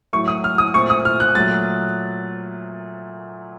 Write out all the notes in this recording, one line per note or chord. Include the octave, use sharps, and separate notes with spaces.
A2 F#3 A3 C#6
D#6
F6
D#6
A#2 A3 C4 C#6
D#6
F6
F#6
A#2 F#3 A3 A6